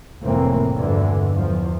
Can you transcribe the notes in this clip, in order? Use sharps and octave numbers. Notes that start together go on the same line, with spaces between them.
F1 F2 A2 E3 A#3 C4
E2 G2 B2 D3 E3
E2 F3